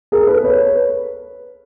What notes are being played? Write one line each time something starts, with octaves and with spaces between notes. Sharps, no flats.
G#4 A#4
A4 B4
B4 C#5